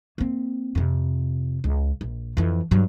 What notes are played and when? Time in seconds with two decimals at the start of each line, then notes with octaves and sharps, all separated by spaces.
0.18 A#3 C4
0.75 F2 C3
1.64 C#2
2.01 A#1
2.37 F2 E3
2.71 G2 F#3